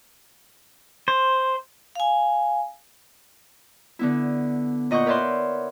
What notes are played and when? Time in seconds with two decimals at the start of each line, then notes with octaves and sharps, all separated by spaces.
1.08 C5
1.95 F5 G#5
3.99 D3 B3 E4
4.91 A#2 D#5 F#5 C#6 G6
5.06 A#4 B4 C#5 D5 E5 C6